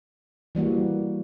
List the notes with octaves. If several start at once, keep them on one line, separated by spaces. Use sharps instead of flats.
E3 G3 A#3 F#4